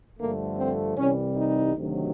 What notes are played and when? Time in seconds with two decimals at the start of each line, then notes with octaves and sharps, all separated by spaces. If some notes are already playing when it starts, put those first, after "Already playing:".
0.19 G2 D3 F3 A3 A#3
0.58 C4
0.97 C2 C3 E3 G3 C#4
1.36 D#4
1.75 D2 C3 D#3 F#3